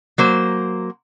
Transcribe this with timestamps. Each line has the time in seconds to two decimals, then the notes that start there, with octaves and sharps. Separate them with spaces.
0.18 F#3 A#3 C5